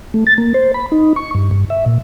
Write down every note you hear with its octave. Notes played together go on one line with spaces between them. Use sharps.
A3
A6
A#3
C5
B5
D#4
C#6
G2
G2
E5
A#2